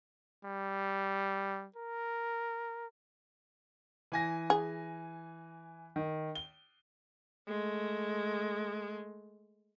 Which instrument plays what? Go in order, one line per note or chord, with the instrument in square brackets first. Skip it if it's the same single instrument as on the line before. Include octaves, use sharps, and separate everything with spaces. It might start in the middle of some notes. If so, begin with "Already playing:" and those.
[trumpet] G3
A#4
[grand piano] E3 G#5 A#6
[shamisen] G#4
[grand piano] D#3
G7
[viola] G#3 A3